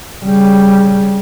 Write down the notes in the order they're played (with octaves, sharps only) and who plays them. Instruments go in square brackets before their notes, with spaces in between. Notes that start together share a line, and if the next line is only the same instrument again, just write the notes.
[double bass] C#3 G3